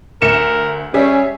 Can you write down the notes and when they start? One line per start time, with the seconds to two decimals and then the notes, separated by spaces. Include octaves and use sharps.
0.22 D2 A#4 C#7 E7
0.94 G3 C#4 G#4 E5